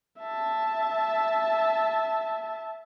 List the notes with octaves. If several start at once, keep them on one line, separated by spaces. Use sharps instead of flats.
E5 A5